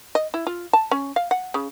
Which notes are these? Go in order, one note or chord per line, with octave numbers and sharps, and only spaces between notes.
D#5
E4
F4
A5
C#4
F5
F#5
C#3